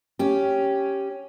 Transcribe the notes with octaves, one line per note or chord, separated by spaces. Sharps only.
C#4 G4